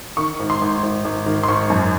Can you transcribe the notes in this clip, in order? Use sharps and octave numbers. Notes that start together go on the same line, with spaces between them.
D#3 C#6
G#1
C6
G#1
G#1
G#1
D#3
C6
G#1 C#6
F#2